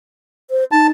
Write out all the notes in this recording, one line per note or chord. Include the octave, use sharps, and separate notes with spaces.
C5
D#4 A5